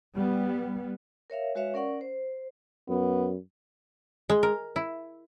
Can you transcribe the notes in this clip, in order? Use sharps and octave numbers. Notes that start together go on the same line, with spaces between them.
G3 B3
A#4 C#5 E5 F5
G#3 F#4 B4 C#5 E5 F5
C#4 A#4 D5 F#5 C#6
C5
F#2 B3
G#3
A#4
E4